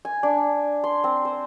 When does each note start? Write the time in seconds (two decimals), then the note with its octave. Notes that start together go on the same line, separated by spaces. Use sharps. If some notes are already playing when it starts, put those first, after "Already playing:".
0.05 G#5
0.23 D4
0.84 C6
1.04 C4
1.25 C5